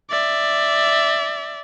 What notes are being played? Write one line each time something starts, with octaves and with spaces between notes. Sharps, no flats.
D5 E5